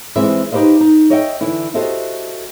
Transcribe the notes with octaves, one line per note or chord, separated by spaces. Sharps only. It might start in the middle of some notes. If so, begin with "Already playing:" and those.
E3 G3 G#3 C4 C5 E5
D#4 G4 B4 C5 D#5 F5
D#4
G#4 C#5 D#5 E5 F#5 G5
D3 E3 E4
F#4 G4 A4 C5 D#5 E5